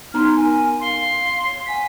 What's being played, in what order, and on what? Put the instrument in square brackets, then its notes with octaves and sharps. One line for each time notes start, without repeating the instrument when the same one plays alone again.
[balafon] B3 D#4 A#5 [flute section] C#4 C6 F6
[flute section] A#4 G#5
[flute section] F5 [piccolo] C6
[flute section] C#5
[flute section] F#5 G#5 C6 [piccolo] B6